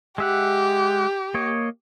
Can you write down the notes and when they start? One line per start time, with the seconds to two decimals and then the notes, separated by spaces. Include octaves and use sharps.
0.18 G#3 G4 E5 F#5
1.34 A#3 C#5 D#5